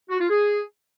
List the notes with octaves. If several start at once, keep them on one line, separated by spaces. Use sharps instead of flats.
F#4
F4
G#4